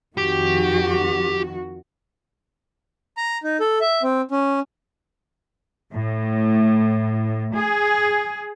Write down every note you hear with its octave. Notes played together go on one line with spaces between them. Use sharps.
F2 D#3 F#4 G4
A#5
D#4
A4
E5
C4
C#4
A2
G#4